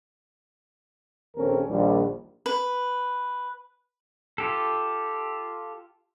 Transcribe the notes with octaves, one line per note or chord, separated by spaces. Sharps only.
A#1 D#2 C4 C#4 A4 A#4
A#1 D#2 G3
B4
F4 G4 A4